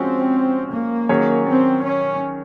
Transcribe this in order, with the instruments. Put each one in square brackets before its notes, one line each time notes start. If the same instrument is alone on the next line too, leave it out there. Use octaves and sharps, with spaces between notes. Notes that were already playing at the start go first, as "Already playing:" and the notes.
Already playing: [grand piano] F3 G#3 C#4 F#4 [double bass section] C4
[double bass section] A#3
[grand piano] D#3 F#3 C#4 G#4 C#5
[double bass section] C4
C#4